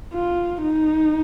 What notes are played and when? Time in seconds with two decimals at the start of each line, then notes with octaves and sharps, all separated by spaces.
0.13 F4
0.62 D#4